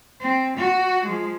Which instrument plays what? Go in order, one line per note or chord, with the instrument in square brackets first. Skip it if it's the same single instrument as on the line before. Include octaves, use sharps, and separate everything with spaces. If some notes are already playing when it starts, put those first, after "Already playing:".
[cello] C4
F#4
F3 G#3